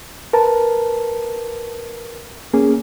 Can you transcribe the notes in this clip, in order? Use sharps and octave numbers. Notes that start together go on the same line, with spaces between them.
A#4 B4 A5
A#3 C#4 G#4